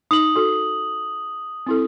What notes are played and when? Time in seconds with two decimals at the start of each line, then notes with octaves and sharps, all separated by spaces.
0.11 D#4 D#6 F#7
0.36 F#4 A4
1.66 C4 E4 A4